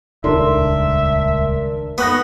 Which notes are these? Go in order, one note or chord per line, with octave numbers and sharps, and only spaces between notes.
D#1 C#2 D4 A#4 E5 C6
B3 C#6 D#6 F#6 A#6